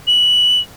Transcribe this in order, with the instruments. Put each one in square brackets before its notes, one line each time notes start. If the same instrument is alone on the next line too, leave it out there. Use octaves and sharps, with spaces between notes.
[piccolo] F#7